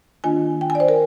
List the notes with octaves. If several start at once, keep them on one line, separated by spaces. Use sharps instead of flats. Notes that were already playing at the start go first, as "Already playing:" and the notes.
D#3 A#3 D4 F4 G#5
G5
G#5
D5
C5
A#4